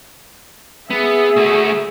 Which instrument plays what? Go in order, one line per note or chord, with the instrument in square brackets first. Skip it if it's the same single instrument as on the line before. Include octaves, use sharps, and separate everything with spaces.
[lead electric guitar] B3 [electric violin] G#4 E5
[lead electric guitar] A3 F#4